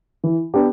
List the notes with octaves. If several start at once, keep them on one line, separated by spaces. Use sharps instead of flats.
E3
B3 D4 G4